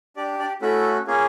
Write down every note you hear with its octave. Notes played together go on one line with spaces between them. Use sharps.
D4 G4 D5
D4 D5
A3 C#4 E4 F#4 A4 E5
A#3 C#4 F4 G#4